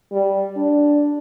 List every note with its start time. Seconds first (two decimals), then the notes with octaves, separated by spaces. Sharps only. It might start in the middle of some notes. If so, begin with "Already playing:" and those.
0.12 G3
0.57 D4